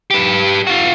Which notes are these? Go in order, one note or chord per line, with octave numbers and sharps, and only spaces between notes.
G4 B4
F4 F#4